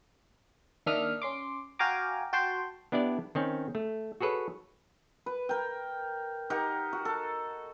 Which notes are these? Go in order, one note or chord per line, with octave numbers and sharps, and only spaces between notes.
D#3 A#3 D4 E5 D#6 F6
C#4 C6 D6
F#4 F5 G5 G#5 A#5 D6
F#4 G5 A5 C6
B3 D4 E4 G4 D5
D#3 C4 C#4
A3
F#4 G#4 A4 B4 C#5
B4
A#4 G5
D#4 G4 A#4 F#5
F#4
A4